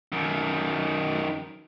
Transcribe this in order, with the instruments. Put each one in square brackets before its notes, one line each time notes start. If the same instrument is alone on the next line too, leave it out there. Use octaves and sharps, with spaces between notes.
[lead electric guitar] F#2 D#3